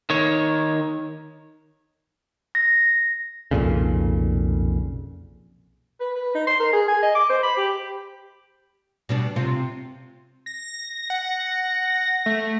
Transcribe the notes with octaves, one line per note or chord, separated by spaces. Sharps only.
D#3 C#5
A#6
B1 F2 A#2 C#3
B4
B4
D#4
C6
A#4
G#4
G#5
D#5
D6
C5
B5
G4
B2 G3 D4
C3 C4 F4
A#6
F#5
A3